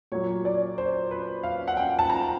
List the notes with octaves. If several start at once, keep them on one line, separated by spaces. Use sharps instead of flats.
A#2 F#3 C#5
D5
C5
B4
F5
F#5
G5
A5
A#5